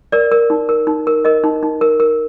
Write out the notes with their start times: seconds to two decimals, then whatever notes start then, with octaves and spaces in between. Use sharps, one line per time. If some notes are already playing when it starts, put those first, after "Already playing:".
0.12 A#4 D5
0.32 A#4
0.50 D#4
0.69 A#4
0.87 D#4
1.07 A#4
1.25 A#4 D#5
1.44 D#4
1.63 D#4
1.81 A#4
2.00 A#4